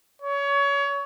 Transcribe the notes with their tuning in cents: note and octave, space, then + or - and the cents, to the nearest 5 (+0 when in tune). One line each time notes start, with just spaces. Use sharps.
C#5 +25